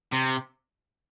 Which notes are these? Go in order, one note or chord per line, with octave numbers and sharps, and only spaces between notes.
C3